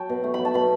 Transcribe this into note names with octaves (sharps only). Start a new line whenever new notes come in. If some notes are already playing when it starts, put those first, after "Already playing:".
Already playing: F#3 G5 A5
B2
A3
F#3 B5
A5
B2 B5